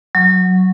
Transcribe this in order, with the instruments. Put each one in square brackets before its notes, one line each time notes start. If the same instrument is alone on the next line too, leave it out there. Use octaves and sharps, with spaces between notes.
[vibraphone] F#3